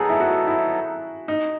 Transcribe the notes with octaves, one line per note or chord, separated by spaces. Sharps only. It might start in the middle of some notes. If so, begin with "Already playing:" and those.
Already playing: F#3 B3 D#4 G#4 A4
E4
F#4
E4
D#4